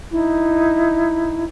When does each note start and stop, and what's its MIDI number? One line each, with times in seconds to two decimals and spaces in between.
0.11 1.45 63
0.11 1.45 64